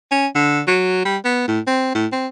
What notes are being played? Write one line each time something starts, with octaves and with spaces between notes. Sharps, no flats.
C#4
D3
F#3
G3
B3
A2
C4
A2
C4